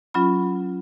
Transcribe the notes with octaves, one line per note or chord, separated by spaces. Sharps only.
F#3 C#4 F4 B5